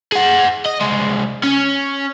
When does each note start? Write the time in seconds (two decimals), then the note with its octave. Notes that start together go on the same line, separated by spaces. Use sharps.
0.12 G#4 F#5
0.65 D#5
0.81 C2 G#3
1.44 C#4